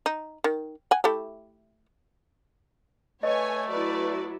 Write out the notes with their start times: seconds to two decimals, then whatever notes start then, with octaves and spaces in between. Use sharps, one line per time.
0.06 D#4
0.44 D#3
0.91 F#5 G#5
1.04 A3 E4 G4
3.23 A3 B4 C#5 D#5 G#5
3.69 F#3 E4 B4 D5